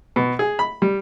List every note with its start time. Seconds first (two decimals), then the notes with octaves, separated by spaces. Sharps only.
0.16 B2
0.39 G#4
0.59 B5
0.82 G3